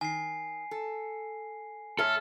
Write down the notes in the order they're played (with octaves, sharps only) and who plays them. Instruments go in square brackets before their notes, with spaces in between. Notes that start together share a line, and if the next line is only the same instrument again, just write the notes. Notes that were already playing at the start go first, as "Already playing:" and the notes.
[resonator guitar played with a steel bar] D#3 [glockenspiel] G#5 C7
[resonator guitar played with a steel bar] A4
[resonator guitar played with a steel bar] G#2 C#5 E5 [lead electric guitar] A4 [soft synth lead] F6